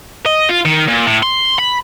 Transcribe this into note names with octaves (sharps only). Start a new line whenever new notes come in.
D#5
F4
D#3
A#2
A2
C6
B5